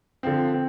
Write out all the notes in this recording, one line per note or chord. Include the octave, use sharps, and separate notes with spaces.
D3 F3 C4
C4